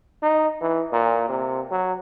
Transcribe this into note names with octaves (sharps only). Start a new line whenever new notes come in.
D#4
E3
A#2
C3
F#3